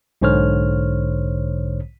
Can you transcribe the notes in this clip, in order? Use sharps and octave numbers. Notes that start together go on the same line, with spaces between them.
B1 G#2 D3 C5 C#5 F6